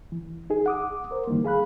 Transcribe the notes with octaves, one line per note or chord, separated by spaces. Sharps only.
E3
D#4 G#4
F#5 D6 D#6
A#4 C5
F#2 D#3 E3 G3 A#3
G#4 F5 B5 F#6